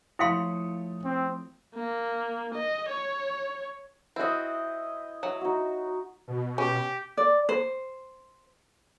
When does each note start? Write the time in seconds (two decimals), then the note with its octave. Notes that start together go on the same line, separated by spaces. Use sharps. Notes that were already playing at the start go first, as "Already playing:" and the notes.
0.19 F3 A3 E4 C#5 F5 C6 D#6 C#7
1.05 C4
1.75 A#3
2.54 D#5
2.90 C#5
4.16 C4 E4 F#4 D#5
5.23 F#3
5.41 D#4 F#4
6.28 B2
6.58 C#4 G4
7.17 D5
7.49 C5